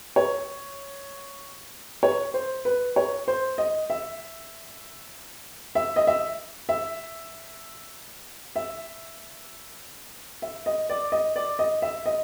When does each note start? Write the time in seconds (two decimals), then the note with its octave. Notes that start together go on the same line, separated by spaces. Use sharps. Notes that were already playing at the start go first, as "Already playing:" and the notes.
0.16 C#5
2.03 C#5
2.34 C5
2.65 B4
2.96 C#5
3.28 C5
3.58 D#5
3.90 E5
5.75 E5
5.96 D#5
6.07 E5
6.69 E5
8.56 E5
10.42 E5
10.66 D#5
10.90 D5
11.12 D#5
11.36 D5
11.59 D#5
11.82 E5
12.06 D#5